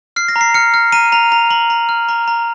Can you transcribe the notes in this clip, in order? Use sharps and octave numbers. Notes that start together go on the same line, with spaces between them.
F6 C7
A#6
A#5
C7
F6 C#7
F6
A#5 D#7
A#5 F7
A#5 F7
A#5 F#7
A#5
F6
A#5
A#5